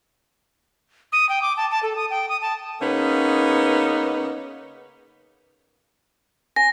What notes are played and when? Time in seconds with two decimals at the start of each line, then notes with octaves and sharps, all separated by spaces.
1.12 D#6
1.29 G5
1.42 D6
1.57 A5
1.71 A5
1.83 A4
1.96 D#6
2.10 G5
2.29 D#6
2.42 A5
2.81 C#3 A#3 B3 C#4 D#4
6.56 G#5 A#6